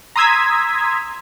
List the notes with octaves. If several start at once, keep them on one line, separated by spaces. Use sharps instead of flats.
A#5 C6 D#6 E6 G#6 B6